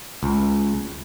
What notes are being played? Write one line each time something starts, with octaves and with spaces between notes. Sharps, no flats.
C#2